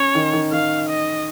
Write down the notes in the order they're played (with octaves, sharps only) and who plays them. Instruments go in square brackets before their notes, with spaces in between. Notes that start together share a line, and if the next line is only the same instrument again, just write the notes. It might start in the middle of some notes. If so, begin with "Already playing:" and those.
Already playing: [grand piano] C#4 [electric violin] C#5
[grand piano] D#3
D#3
[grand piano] D#3 [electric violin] F5
[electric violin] D#5